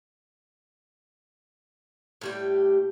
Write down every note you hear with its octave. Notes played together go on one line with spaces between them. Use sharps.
A2 G3 G4